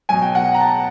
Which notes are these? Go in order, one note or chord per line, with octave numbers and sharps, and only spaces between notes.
B2 F#3 G#5
G5
F#5
A#5
A5